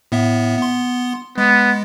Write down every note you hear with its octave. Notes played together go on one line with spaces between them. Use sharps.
A2 B3 E5
B3 C6
G#3 B3